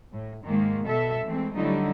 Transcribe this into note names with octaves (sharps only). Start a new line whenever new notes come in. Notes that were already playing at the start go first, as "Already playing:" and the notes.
A2
G#2 D#3 G#3 A#3
B2 A4 E5
E3 G#3 A3 C4
D3 F#3 G3 A3 D#4 E4